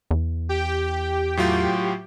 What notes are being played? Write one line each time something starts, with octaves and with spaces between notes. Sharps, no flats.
E2
G4 G5
A2 F#3 F4